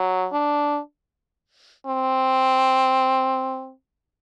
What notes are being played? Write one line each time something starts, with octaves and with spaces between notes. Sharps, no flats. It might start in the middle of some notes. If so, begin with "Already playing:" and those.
Already playing: F#3
D4
C4